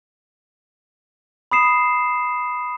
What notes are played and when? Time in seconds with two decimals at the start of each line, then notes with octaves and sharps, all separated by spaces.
1.52 B5 D#6 C7 E7